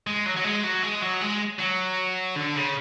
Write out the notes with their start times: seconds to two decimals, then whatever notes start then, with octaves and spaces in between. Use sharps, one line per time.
0.07 G#3
0.26 F#3
0.37 F#3
0.45 G#3
0.64 F#3
0.83 G#3
1.02 F#3
1.21 G#3
1.59 F#3
2.36 D3
2.56 C#3